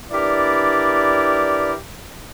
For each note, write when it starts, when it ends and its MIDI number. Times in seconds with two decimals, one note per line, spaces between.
0.12 1.74 62
0.12 1.74 64
0.12 1.74 67
0.12 1.74 70
0.12 1.74 71
0.12 1.74 74